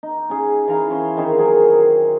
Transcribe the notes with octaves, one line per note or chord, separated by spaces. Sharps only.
D#4
C#4 G#4
E3 E4 F5 A#5
C#4 C5 G#5
D#3 C4 G#4 C#5
F#3 G#4 A#4